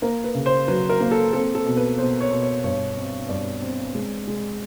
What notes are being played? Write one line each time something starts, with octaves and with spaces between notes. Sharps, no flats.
A#3 A#4
B4
C#3
C5
F#3 B4
A#4
A#3
A4
C4 A4
A4
B2
B4
B2 C5
C#5
B2
C#5
G2 C#5
C4
G2 D5
C4
G#3
G#3